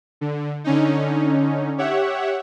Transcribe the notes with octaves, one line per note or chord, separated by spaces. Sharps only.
D3
D3 C#4 D#4
G4 C#5 E5 F#5